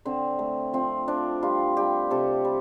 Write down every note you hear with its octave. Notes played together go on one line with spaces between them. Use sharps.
D3 C4
A3
F3 C4
F3 D4
G3 F4
G3 G4
C3 A4
G3